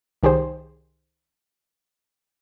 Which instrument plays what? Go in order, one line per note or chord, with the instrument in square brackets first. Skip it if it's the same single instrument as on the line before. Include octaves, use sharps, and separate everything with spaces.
[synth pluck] C2 D#3 G4 G#4 C5